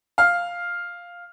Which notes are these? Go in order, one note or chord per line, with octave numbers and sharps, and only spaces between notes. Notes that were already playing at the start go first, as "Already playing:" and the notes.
F5 F6